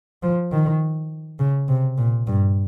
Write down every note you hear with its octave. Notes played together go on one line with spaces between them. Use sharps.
F3
D#3
C#3
C3
A#2
G2